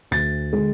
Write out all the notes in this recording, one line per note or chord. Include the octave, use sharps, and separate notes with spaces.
D2 A6
D3 G#3